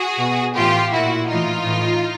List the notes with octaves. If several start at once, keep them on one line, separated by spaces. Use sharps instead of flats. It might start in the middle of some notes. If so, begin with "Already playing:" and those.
Already playing: F#4 G#4
B2
A2 E3 F4 G4
A#2 E4 F#4
A2 E3 D#4 F4
A2 E3